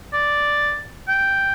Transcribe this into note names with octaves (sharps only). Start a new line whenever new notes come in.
D5
G5